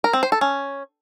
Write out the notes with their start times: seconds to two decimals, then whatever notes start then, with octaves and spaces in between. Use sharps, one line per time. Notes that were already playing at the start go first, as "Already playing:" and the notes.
0.04 A#4
0.13 C4
0.23 C5
0.32 A4
0.41 C#4